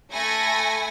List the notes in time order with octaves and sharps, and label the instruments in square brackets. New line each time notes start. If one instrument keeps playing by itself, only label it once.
[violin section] A3 G#5 B5 A#6 C#7